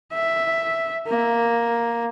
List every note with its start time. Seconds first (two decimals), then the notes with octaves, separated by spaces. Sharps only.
0.13 E5
1.08 A#3